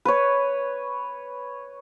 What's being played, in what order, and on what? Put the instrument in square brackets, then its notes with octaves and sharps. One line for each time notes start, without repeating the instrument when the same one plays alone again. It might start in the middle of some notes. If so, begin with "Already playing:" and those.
[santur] B4 C#5